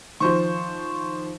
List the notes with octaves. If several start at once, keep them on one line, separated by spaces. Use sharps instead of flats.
D#3 F3 C5 C#6